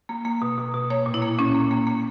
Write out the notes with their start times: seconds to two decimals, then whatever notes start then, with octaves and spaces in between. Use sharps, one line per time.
0.09 A#3
0.25 A#3
0.42 B2
0.58 B2
0.74 B2
0.90 A#3 C#5
1.06 A#2
1.14 E4
1.22 A#3
1.39 A#2 C#4
1.55 A#3
1.71 A#3
1.87 A#3